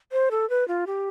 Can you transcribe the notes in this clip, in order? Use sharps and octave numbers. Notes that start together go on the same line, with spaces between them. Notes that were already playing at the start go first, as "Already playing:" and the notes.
C5
A4
B4
F4
G4